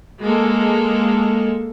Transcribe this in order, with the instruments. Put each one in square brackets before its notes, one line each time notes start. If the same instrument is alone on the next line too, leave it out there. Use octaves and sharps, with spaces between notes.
[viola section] G#3 A#3 A4